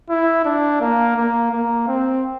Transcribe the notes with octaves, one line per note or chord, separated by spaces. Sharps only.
E4
D4
A#3
A#3
A#3
C4